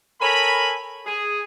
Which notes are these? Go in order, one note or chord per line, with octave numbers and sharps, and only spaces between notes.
A4 A#4 C#5 G#5 B5
G#4